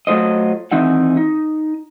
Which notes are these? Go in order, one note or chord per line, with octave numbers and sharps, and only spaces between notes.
F#3 A3 F4 C5 D#5
D#3 E3 C4 D#4 E5 F#5
D#4